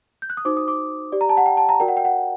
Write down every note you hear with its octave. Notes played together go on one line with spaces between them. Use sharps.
G6
F#6
D#6
D#4 F#4 C5 D6
D#6
D6
G4 D5
A#5
A5
F#5
G5
A5
A#5
F#4 A#4 D5 G5
F#5
G5
F#5